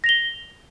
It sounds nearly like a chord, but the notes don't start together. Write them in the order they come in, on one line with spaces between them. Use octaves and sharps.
A#6 F7 G7